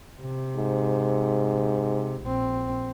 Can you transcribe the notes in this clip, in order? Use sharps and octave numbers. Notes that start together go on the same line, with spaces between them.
C3
G#2
A#1 C4